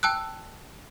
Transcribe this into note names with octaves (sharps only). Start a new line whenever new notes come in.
G5 A5 E6 F#6